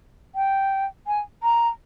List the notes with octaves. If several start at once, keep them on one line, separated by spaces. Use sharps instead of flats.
G5
G#5
A#5